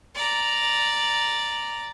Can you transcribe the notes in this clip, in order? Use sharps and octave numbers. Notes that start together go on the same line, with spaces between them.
D5 A#5